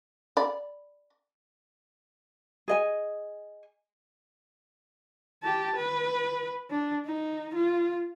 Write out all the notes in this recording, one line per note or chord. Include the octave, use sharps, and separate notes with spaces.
D5 B5
G#4 D#5 G#5
G4 A5
B4
D4
D#4
F4